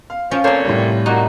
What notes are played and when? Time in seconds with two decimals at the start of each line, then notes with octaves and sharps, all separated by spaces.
0.10 F5
0.31 F3 C#4 F4
0.44 A#2 C4 A4 C5 C#5
0.65 A2 C3 G3
1.06 A#2 D#4 F#4